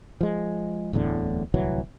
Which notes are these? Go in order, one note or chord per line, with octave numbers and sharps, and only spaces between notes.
F3 G#3
D1 E2 A2 D3
D1 C2 E3 F#3